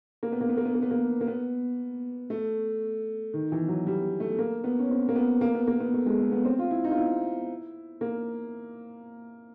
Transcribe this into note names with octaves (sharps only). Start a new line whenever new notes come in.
A#3
B3
A#3
B3
A#3
B3
A#3
B3
A#3
A#3
B3
A3
D#3
E3
F#3
G3
A3
A#3
B3
C#4
C4
A#3
B3
A#3
B3
A#3
B3
A3
G#3
A3
B3
C4
F4
E4
D#4
F4
E4
A#3